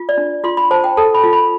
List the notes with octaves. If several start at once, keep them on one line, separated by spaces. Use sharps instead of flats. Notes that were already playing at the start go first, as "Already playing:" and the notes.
Already playing: F4
D5
D4
F4 C6
B5
C5 A5
G5
A4 A5
B5
F4
B5